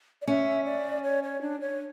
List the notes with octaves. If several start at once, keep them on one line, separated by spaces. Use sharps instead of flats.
D5
C#4 E5
D5
C#5
C#5
D4
C#5